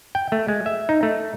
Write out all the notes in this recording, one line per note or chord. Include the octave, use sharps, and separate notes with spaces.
G5
A3
G#3
E5
D#4
A3